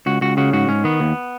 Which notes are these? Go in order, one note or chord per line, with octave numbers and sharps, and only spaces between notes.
C#2 F#4
C#2 F#4
C#3 F#4
G#2 F#4
G#2 C#4
D#3 B3
D#2